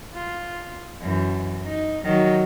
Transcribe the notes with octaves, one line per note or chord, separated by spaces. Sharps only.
F4
F#2 E3
D#4
D#3 F#3